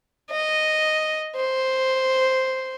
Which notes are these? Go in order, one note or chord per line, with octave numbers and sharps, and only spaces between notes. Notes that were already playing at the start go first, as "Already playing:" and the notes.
D#5
C5